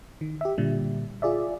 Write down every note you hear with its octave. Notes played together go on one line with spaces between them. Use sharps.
D#3
G4 E5
A#2 D3 G3
F4 G#4 D5 E5